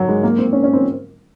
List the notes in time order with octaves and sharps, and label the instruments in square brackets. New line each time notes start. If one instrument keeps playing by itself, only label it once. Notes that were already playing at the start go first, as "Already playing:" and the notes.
Already playing: [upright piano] F#3
G#3
A#3
C4
C#4
C#4
C4